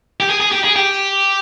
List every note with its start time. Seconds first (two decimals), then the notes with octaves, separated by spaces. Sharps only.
0.20 G4
0.29 G#4
0.40 G#4
0.52 G4
0.64 G#4
0.76 G4